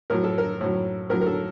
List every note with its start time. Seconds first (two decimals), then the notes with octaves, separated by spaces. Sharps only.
0.10 A2 F#3 A#4
0.24 A4
0.38 A#4
0.61 A2 F#3
1.10 A2 F#3 A#4
1.21 A#4
1.26 A4